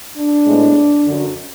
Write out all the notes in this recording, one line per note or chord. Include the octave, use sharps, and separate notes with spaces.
D4
A2 G#3 B3
F#2 D3 F#3